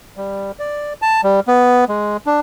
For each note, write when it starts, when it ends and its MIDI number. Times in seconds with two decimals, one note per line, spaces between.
0.17 0.51 55
0.59 0.93 74
1.02 1.21 81
1.24 1.40 55
1.48 1.85 59
1.89 2.17 56
2.26 2.40 62